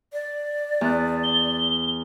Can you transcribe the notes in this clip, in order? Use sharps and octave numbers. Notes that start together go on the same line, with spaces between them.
D5
E2 F#6
G7